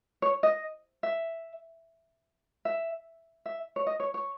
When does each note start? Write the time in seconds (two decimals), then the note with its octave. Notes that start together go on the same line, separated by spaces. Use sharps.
0.22 C#5
0.43 D#5
1.03 E5
2.65 E5
3.46 E5
3.76 C#5
3.87 D#5
4.00 C#5
4.14 C#5